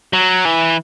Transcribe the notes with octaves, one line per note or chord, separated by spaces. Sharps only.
F#3
E3